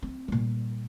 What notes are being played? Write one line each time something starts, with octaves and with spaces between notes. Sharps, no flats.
C4
A#2 G3